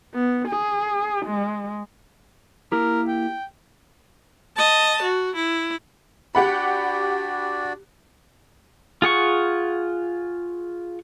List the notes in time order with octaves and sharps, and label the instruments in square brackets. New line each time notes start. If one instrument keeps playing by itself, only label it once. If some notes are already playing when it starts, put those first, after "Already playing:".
[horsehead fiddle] B3
G#4
G#3
[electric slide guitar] A#3 E4 G4 [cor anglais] A#4
[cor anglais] G5
[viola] D#5 A5
F#4
E4
[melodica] D4 F#4 D5 [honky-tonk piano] G4 F#5 B5
[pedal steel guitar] F4 G#4 F#5 C#6